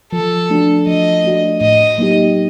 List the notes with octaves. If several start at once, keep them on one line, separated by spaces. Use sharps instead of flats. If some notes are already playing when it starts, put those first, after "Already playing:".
F3 A4
A3 D4 F#4
F3 D#5
A3 D4 F#4
A2 D#5
F#3 A#3 D#4 G4